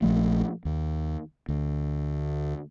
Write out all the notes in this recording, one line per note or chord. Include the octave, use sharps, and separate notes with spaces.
A#1 F3 A3
D#2
D2